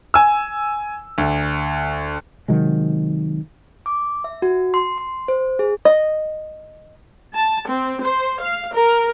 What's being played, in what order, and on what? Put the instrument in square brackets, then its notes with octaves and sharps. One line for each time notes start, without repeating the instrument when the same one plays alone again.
[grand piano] G#5 E6
D2
[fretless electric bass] C3 D#3 F#3 G#3
[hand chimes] D6
E5
F#4
C6
C6
C5
G#4
[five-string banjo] D#5
[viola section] A5
C4
C5
F5
A#4